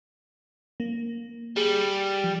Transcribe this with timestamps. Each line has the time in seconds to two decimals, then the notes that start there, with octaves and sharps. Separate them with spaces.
0.80 A#3
1.57 G3 G#4
2.24 F3